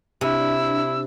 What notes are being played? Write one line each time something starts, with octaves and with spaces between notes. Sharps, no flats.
C3 D4 E4 E6